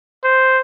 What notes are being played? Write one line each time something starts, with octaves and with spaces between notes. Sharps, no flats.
C5